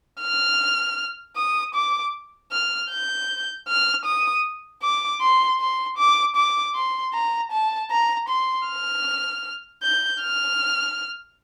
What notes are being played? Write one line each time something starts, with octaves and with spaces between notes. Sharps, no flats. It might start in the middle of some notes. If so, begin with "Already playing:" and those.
F6
D#6
D6
F6
G6
F6
D#6
D6
C6
C6
D6
D6
C6
A#5
A5
A#5
C6
F6
G6
F6